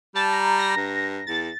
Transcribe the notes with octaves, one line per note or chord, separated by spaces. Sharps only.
G3 A5
A#5
A#6
G2
E2 A6